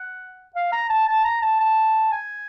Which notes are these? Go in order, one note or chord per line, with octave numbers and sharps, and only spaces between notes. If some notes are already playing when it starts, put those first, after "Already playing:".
Already playing: F#5
F5
A#5
A5
A5
A#5
A5
A5
G#5